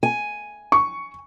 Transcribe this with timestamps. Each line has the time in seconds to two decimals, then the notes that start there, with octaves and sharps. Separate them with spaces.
0.03 G#5
0.72 C#6